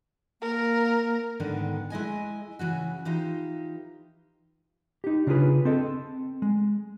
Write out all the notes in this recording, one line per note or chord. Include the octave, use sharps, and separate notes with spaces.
A#3 A#4
G#2 D3 D#3 B3 D4
G#3 E4 D#5 G#5
C#3 E3 C#4 F#4
E3 D#4 F4 G4
D#4 G4
C#3 D4 F4 G4 G#4 B4
C4 A4 D#5
G#3